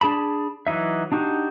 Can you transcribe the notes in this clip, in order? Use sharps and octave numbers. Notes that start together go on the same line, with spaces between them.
D4 G#4 A5 B5
E3 F#3 D#4 E5
D4 D#4 F#4 G4